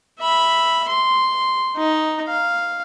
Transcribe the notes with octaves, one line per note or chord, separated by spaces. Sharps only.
E5 B5
C6
D#4
F5